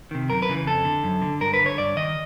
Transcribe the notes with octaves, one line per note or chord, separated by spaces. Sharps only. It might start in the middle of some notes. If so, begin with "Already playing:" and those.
C3 D#3
F#2 A#4
B4
C#3 E3
F2 A4
D3
F#2
D3
G2 A#4
B4
D3
C#5
G2 D5
D#3 D#5